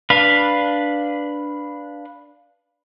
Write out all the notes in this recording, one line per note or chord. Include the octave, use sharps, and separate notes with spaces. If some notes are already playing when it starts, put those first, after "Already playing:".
D4 B4 F5